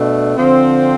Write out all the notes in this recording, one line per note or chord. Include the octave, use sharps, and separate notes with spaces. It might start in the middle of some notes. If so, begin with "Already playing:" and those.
Already playing: B2 A3 D4
D3 F3 C4